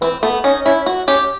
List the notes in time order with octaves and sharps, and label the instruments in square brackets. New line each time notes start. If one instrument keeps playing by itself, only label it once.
[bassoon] E3 [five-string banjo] C4
[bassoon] A3 [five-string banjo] B3
[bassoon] C#4 [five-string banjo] D#4
[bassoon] C#4 [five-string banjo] E4
[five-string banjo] F#4
[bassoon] C#4 [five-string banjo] G4